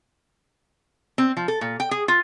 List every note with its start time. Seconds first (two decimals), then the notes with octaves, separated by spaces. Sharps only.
1.18 C4
1.37 F3
1.48 A4
1.61 A#2
1.80 G5
1.91 G#4
2.08 F4